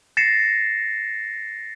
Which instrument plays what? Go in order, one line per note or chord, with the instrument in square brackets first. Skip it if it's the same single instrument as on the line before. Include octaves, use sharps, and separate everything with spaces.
[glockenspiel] A6 A#6 C7 C#7 E7